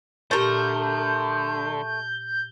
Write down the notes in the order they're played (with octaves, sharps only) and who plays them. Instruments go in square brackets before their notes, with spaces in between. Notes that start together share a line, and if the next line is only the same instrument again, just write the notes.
[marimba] A#2 G4 A6 [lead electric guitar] D3 [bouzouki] A3 A#4 [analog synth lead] G6